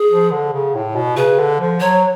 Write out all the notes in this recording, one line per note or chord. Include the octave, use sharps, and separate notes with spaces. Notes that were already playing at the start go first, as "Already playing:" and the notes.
Already playing: G#4
F3
D3
C#3
A2
B2
C#3 B4
D3
F3
F#3 C#5